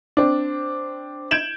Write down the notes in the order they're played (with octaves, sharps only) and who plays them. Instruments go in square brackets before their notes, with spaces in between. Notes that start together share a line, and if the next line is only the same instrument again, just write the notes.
[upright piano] C4 D4
G6 G#6 D7 E7 F#7